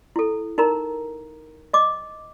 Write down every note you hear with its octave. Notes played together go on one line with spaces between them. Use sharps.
E4 A4
D#4 A#4 A#5
D#5 D6